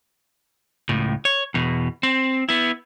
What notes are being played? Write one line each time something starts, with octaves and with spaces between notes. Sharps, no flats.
C#2 A2
C#5
E2 B2
C4
B3 E4